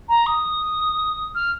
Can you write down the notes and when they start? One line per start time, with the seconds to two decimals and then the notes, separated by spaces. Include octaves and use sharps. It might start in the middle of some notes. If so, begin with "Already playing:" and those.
0.09 A#5
0.26 D#6
1.35 F6